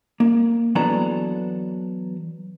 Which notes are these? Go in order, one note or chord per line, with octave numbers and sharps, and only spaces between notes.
A#3
E3 F#3 B3 D4 A4 A#5